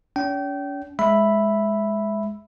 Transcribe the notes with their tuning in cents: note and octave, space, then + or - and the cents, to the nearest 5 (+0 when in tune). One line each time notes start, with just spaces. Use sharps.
C#4 +45 G5 -25
G#3 +0 E5 +0 B5 +0